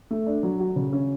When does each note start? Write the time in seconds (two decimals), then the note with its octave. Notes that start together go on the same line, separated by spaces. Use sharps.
0.11 A3
0.26 D4
0.43 F#3
0.60 F#4
0.76 C#3
0.92 C#4